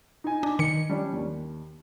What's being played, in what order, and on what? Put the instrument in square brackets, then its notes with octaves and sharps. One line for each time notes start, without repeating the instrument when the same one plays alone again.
[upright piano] D#4 G#5
[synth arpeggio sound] D4
D#3 C#7
[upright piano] G3 C#4 D4
D#2